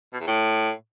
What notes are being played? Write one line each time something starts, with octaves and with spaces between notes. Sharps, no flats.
B2
E2
A2